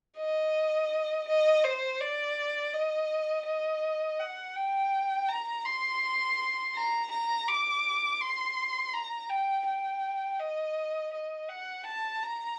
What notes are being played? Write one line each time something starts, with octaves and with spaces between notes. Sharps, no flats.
D#5
D#5
C5
D5
D#5
D#5
F#5
G5
A#5
C6
A#5
A#5
D6
C6
A#5
G5
G5
D#5
D#5
F#5
A5
A#5